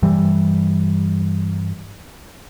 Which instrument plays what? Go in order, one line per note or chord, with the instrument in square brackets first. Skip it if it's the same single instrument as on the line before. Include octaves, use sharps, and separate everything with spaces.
[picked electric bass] G2 E3 G3